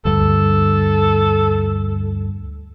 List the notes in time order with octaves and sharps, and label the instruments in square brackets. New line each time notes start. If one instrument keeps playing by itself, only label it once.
[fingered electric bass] D2 G2 [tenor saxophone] A4